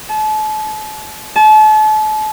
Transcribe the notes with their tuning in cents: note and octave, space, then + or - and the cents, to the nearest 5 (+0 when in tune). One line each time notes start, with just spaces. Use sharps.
A5 -35
A5 -35